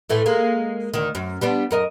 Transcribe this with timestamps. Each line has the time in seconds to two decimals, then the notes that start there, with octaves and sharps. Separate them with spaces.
0.09 A2 E3 A3
0.26 G#3 A#3
0.94 D2 D#3
1.15 F#2
1.41 G3 B3 D4
1.71 F#2 A#4 D#5